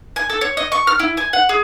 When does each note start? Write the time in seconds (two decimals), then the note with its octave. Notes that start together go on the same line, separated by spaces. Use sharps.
0.16 G#5
0.30 A4
0.41 C#5
0.57 D#5
0.72 C#6
0.87 F6
1.00 E4
1.17 G#5
1.33 F#5
1.49 G#4